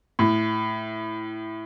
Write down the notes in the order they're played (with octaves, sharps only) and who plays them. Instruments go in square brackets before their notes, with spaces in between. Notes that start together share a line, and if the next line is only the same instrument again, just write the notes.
[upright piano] A2